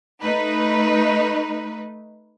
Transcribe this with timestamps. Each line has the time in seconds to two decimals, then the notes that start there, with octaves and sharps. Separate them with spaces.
0.21 A3 D#4 B4